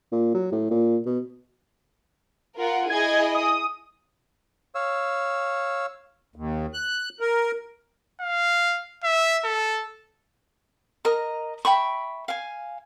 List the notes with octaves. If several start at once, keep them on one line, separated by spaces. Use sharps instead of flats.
A#2
F#3
A2
A#2
B2
F4 A#4 F#5
E4 G#4 D#5 G#6
D#6
C#5 F5 E6
D#2
F#6
A#4
F5
E5
A4
A#4 D#5 A#5
E5 G5 B5 C#6
F5 G#5